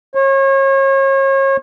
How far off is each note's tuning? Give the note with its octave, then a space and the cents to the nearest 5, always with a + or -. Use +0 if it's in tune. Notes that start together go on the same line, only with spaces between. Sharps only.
C#5 -35